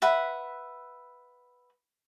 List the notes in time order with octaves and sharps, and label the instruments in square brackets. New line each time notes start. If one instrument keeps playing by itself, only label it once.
[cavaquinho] B4 E5 F#5 B5